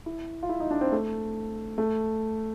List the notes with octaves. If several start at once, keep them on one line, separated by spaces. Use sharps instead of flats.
E4
F4
E4
D#4
D4
C4
A3
A3